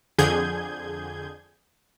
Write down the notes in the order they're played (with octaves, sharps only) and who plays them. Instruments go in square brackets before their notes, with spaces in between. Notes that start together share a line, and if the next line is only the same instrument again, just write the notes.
[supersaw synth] F2 D3 G#4 G6 G#6